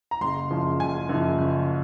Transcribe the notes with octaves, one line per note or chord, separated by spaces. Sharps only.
A#5
F#1 C6
F#2 C#3 F3
F#1 G#5
F#2 C#3 F3
F#1